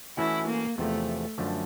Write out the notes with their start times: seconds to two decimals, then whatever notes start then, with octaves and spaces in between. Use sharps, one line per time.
0.17 E3 A3 C#4 E4 F#4
0.47 A#3
0.78 E2 C3 F3 A3
1.38 F#2 D3 F3 A3